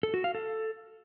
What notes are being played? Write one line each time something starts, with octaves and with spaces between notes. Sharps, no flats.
A4
F#4
F5
A4